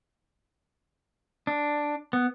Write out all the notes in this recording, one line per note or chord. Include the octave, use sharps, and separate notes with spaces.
D4
B3